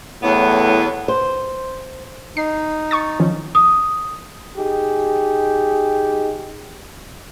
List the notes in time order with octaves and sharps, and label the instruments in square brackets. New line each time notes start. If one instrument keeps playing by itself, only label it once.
[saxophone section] E2 F#3 B3 [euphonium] A2
[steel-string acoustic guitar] C5
[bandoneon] D#4 [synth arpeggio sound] C7
[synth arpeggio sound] C#6 D#6 A6
D#3 F3 C#4
[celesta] D#6
[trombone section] D#4 G4 G#4